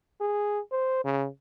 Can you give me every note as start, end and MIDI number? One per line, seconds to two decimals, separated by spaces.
0.21 0.59 68
0.72 1.00 72
1.04 1.27 49